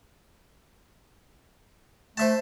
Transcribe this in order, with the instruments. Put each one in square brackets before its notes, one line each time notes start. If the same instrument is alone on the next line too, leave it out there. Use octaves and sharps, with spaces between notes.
[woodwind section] A3 [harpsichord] C5 E5 A5